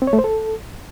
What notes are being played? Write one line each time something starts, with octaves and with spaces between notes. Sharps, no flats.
C4
C#5
A3
C5
A4